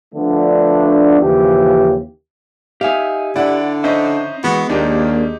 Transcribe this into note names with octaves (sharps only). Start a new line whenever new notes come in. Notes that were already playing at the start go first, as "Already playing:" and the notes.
D3 F3 A3 B3 D4
D#2 C#3 E3 F3 G4
D#4 G4 E5 F5 G#5
D3 E4 D5 F#5
C#4 D#4 C5 D#5 E5
E2 E3 G#3 B3 F#4
D#2 A#3 D4 D#4 G4